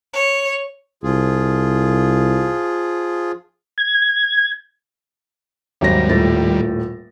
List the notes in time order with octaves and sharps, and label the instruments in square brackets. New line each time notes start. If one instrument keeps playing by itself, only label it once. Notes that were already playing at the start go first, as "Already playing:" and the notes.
[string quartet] C#5
[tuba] C2 [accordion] F3 F4 G#4
[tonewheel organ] G#6
[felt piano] G#1 F#3 A#6 [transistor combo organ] D#2 G3
[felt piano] D#1 A2 A6